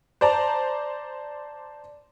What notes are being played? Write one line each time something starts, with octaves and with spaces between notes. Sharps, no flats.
C5 D5 A5 A#5